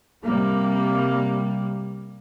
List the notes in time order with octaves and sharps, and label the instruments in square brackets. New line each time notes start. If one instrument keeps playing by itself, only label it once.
[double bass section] C3 G3 A#3